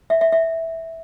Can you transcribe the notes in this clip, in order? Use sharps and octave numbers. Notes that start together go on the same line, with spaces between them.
E5
E5
E5